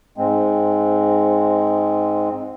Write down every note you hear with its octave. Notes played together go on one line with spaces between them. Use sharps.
G#2 G#3 C4